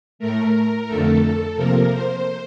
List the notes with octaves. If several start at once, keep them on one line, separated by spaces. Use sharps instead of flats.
A2 A3 A#4
F2 D3 A3 A4
C3 F3 A#3 A#4
C5